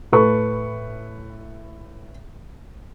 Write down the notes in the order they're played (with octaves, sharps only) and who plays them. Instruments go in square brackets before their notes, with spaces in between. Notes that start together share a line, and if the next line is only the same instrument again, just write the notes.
[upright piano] A2 A4 B4 C#6